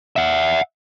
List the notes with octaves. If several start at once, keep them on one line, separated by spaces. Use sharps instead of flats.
E5 F#5